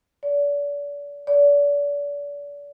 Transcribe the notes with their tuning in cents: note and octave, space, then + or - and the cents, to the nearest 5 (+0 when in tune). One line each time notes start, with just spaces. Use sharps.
D5 -40
D5 -35